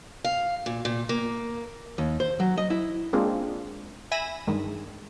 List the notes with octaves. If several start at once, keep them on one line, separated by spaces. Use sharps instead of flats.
F5
A#2
A#2
A#3
D#2
C5
F#3
D#5
E4
G#3 A#3 C4 D4 F4 G#4
E5 G#5 B5 E6 A#6 D#7
G2 D#3 G#3